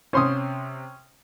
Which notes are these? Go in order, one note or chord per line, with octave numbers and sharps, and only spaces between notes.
C3 C#4 C5 C6 D#6